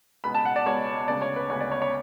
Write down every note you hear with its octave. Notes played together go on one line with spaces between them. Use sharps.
C#2 B2 G#3 B3 B5
A5
F#5
D5
C#2 B2 G#3 B3 C#5
D2 C#3 G#3 B3 D5
C#5
B4
D2 C#3 G#3 B3 C#5
D5
C#5
C#5